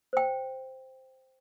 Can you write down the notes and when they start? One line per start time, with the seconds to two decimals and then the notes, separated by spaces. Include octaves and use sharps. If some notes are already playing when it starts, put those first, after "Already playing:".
0.13 C5 G5